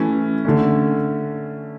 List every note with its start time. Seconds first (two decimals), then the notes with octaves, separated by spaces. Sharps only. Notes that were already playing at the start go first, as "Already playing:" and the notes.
Already playing: E3 A3 C#4
0.45 D3 A3 C#4